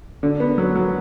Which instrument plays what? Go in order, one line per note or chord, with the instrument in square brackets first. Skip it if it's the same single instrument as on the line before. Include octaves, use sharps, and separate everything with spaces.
[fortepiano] D3
B3
F#3
F#3